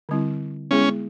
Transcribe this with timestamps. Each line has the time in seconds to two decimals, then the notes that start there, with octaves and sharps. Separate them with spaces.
0.09 D3 G3 C4 E4
0.71 G#3 B3 C#4 E4 G#4